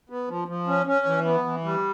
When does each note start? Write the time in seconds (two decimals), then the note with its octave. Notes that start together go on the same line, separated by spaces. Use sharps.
0.10 B3
0.29 F3
0.48 F3
0.68 C#4
0.87 C#4
1.06 E3
1.25 B3
1.45 E3
1.64 G3